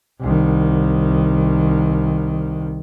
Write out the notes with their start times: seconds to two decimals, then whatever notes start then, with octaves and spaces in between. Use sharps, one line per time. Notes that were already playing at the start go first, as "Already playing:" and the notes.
0.21 C2 D#3